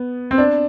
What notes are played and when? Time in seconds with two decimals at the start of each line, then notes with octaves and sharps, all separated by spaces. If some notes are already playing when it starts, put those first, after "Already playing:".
Already playing: B3
0.31 C4
0.38 D4